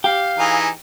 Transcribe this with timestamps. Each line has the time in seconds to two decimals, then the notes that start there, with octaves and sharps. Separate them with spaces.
0.04 G4 F5
0.38 E3 D#4 G#4